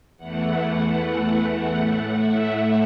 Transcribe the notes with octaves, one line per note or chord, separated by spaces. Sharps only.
E2 E3 A3 F#5
F#5
A2 A3
E5
E5